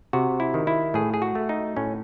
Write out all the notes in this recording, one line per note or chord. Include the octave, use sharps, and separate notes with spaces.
C3 F#4
E4
D#3
E4
A2 G#4
G#4
F#4
A3
D#4
A2 C#4